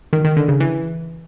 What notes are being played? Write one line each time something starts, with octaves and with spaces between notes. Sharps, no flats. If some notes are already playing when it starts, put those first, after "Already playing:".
D#3
D#3
D3
C#3
E3